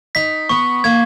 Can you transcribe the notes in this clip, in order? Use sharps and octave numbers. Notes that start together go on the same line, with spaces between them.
D#4 B6
B3 C#6
A#3 G#6